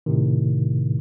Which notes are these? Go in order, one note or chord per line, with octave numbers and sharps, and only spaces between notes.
A2 C3 D#3